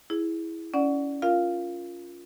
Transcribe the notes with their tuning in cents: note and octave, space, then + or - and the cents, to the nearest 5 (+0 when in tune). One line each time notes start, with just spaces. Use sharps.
E4 +0 G#4 +0
C#4 +20 D5 +0 F#5 +0
F4 +0 A#4 +10 F5 +0